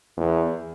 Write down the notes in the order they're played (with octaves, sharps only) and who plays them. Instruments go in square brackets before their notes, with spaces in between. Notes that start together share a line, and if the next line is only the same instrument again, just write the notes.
[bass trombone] E2